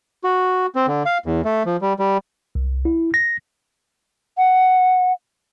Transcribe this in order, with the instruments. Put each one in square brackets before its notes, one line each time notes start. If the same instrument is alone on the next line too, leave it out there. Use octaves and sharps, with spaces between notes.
[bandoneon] F#4
C4
D3
F5
E2
A3
F3
G3
G3
[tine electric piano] C2
E4
A#6
[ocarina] F#5